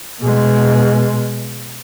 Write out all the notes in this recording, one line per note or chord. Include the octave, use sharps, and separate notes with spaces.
B2 G#3